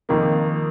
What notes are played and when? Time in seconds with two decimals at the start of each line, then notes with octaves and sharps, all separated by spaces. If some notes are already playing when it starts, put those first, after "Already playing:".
0.09 F2 D#3 A#3